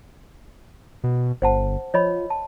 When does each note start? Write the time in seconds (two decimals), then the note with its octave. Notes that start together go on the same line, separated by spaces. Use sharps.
1.04 B2
1.42 G1 C5 F#5 A5
1.94 F3 C#5 D#5 B5
2.30 A5